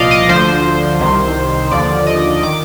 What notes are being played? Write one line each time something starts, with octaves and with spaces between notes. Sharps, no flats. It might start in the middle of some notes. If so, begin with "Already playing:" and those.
Already playing: C2 A#2 F3 D5 D#5 F5
D#5
D2 D3 F3 C5
C2 C3 D#3
D#2 D3 F3 D5
D#5
D#3 D6